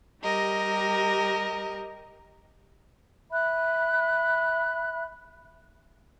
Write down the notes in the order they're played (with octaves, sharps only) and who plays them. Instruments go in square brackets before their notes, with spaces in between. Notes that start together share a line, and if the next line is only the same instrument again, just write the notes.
[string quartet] G3 G4 A#4 D#5
[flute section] E5 B5 F#6